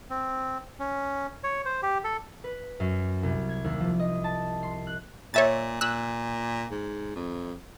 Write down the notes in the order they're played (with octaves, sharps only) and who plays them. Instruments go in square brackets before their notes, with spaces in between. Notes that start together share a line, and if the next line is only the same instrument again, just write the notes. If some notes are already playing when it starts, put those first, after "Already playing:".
[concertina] C4
C#4
C#5
C5
G4
A4
[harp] B4
F#2
C2
G#6
D#2
F3
D#5
A5
C6
F#6
[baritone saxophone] A#2 [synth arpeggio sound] C#5 E5 A6
[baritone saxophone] A#2 [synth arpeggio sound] E6 F#6
[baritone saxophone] G#2
F2